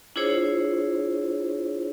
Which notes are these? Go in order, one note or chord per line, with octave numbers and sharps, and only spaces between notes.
D4 E4 F4 G#4 C5 C#5